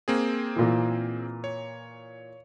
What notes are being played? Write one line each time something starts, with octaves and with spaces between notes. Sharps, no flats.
A#3 C4 G#4
A#2 E3
C#5